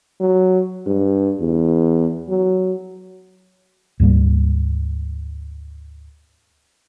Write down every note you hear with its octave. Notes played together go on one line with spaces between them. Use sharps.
F#3
G2
E2
F#3
D2 G#2 G3 A#3